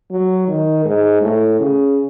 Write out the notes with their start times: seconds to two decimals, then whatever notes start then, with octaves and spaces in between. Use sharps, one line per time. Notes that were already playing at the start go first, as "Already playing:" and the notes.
0.11 F#3
0.48 D#3
0.85 G#2
1.22 A2
1.60 C#3